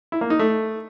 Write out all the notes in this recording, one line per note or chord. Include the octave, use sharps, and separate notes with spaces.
E4
A#3
D#4
A3